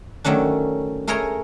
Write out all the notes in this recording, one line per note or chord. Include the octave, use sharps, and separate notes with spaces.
D#3 F#3 A3 C#4 D4
A3 G#4 A#4 C#5 D#5 A#5